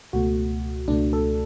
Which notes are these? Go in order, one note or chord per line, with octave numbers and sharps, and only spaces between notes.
C#2 B2 A3 F#4
C#2 B2 A3 D4
A4